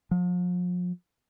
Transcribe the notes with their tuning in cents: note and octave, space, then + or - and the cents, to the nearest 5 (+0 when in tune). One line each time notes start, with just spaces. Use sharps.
F3 +40